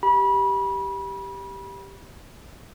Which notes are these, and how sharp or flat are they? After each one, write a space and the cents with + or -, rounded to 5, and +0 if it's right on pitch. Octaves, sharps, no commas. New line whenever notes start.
G4 +0 B5 -30